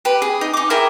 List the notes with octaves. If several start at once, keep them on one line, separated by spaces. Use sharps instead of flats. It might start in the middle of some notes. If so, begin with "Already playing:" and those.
G4 B4
G#4
D#4
D#4 D6
E4 G#4 A#4 G5